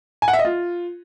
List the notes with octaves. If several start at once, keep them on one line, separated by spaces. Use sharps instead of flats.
G#5
F#5
E5
D#5
F4